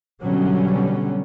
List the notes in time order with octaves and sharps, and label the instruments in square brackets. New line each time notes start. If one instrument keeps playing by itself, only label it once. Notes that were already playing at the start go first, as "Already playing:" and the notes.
[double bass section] B2 D3 F#3 G3 C#4